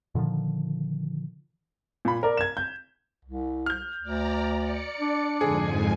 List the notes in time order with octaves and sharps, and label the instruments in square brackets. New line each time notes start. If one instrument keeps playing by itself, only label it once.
[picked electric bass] A#2 D3 D#3 F3
[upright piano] A#2 B5
A#4 D5
G#6 E7
G6
[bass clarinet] C2
[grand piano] F6 G6
[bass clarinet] D2 [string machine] D5 A#5
[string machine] D5 C#7
[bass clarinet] D4
[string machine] F2 G#2 G#5 [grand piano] D3 G#4